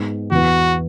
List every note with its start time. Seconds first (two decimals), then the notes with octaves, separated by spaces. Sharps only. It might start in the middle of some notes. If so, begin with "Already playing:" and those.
Already playing: G#2 G#3 B3
0.31 E2 E3 B3 F#4